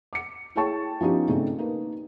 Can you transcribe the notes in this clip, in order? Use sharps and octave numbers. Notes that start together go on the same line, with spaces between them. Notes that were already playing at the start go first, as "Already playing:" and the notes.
D6 C#7
E4 G#4 C#5 G5 A5 C#6
F3 B3 C#4 D#4 E4 G4
G#2 C#3 A3 C4 D4
A#3 D#4 B4